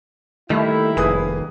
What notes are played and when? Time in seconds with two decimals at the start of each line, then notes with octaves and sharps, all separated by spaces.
0.50 D#3 G3 A3 A#3 E4
0.97 F1 G#4 B4 D#6